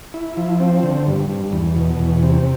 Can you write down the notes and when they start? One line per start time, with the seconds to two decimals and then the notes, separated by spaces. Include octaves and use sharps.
0.14 E4
0.37 F3
0.60 C4
0.83 D3
1.07 G2
1.29 G2
1.52 E2
1.76 B2
1.99 E2
2.23 C3